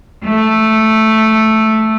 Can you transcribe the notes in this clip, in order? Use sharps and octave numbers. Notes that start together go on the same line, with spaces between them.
A3